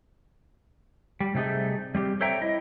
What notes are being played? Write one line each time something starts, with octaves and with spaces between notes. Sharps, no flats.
G3
C3 G3 A3 D#4 G#4
G3 C4 G4
A4 C5 C#5 E5 G5 A#5
E4 D#5